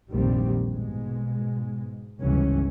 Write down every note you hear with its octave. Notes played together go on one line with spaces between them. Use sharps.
F1 A#1 G2 D#3 G3 C4
G#2 B2 G#3
G1 C#2 G2 C3 E3 C#4